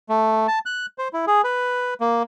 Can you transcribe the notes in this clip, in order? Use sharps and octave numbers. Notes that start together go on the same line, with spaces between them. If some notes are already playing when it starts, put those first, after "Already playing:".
A3
A5
F#6
C5
E4
G#4
B4
A#3